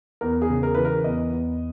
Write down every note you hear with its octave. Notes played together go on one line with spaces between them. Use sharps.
E2 A#4
G#4
C#3
A#4
E3 B4
A#4
E2 D#5
E2